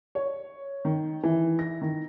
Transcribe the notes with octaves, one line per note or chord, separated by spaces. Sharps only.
C#5
D#3
E3
A#6
D#3